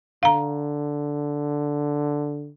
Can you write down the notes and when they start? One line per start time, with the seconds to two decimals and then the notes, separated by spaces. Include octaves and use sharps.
0.23 D3 F5 A#5